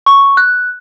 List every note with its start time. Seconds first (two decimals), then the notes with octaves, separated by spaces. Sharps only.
0.06 C#6
0.37 F#6